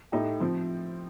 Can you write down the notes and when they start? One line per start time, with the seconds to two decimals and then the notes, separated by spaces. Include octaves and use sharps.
0.12 A2 A3 D#4 G4
0.40 F3 C4